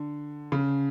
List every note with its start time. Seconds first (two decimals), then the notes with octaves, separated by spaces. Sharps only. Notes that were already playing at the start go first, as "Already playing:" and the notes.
Already playing: D3
0.52 C#3